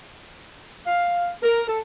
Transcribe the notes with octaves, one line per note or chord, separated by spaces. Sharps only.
F5
A#4
A4